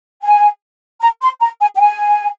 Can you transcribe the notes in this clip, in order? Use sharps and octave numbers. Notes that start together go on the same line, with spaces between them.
G#5
A#5
C6
A#5
G#5
G5
G#5